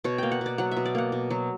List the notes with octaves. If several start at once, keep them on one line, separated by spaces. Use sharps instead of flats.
B2 C#5
A#3 G5
F#5
B2 D5
F#3 F#5
E5
B2
D5
A#3 F#5
B2
F#3